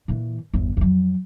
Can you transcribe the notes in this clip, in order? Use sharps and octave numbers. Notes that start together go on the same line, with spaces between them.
A#2 E3
G1 E2
F2 F#3